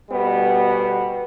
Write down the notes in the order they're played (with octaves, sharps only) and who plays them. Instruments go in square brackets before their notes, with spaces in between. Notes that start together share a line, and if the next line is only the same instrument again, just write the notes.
[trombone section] D2 B2 G3 B3